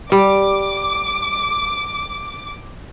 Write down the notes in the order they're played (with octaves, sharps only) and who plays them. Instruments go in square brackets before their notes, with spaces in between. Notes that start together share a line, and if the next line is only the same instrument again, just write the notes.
[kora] G3 [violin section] D6